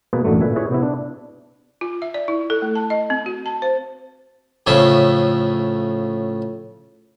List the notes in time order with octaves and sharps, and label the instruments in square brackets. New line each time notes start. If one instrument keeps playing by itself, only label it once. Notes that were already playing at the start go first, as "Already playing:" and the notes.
[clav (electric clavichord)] B2 A#3 G#4 B4
A1 F#2 D3 F#3 A3
A#2 B4 E5 G#5
E4 G#4 B4 C#5
C3 B3 E4
D4
[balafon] F4
E5
D5
E4
A4
A3
A5
D#5
C4
F#4
A5
C5
[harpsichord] A2 C#3 F3 E5